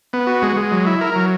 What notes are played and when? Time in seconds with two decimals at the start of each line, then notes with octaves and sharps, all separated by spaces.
0.13 B3
0.27 F#4
0.42 G#3
0.57 G#3
0.72 F#3
0.86 E4
1.01 A#4
1.16 F#3